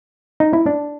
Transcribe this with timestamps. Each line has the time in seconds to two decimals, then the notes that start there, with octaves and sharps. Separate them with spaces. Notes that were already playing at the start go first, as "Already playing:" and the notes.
0.40 D#4
0.53 E4
0.66 D4